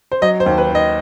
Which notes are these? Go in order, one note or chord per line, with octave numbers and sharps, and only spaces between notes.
C5
F#3 D#5
C5
D#2
B4
D#3 D#5